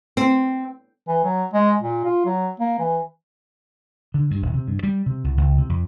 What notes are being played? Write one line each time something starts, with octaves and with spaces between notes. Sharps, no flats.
C4
E3
F#3
G#3
A#2
F4
F#3
A#3
E3
D3
G2
D#1
C3
G2
G3
C3
C2
C#2
C3
F2